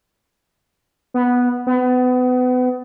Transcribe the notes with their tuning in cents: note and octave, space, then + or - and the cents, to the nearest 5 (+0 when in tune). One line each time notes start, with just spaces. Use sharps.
B3 -5
B3 +30